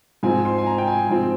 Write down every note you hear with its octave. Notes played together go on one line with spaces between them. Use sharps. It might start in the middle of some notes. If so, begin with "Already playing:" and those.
G#2 F3 C4 G#5
C6
G#5
A#5
G5
G#5
G#2 F3 C4